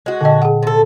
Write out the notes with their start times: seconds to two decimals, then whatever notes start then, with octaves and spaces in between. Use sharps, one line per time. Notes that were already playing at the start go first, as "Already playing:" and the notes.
0.06 G#3 F#4
0.21 A#2 D3 D#5 G5 A5
0.42 G#4 F#5
0.63 C3 A4